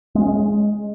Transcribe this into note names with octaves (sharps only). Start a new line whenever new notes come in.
G#3
C#4
G#3